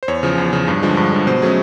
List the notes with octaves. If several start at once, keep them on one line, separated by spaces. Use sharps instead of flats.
C5
E2 C#5
C#3 F3
E2
C#3 F3
G2
D3 F3 G#3
G2
D3 F3 G#3
B2 C5
F#3 A3 C#4 G#4